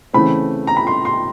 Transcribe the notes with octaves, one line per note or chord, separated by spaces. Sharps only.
C#3 E3 A3 C4 B5
A#5
B5
C6
C6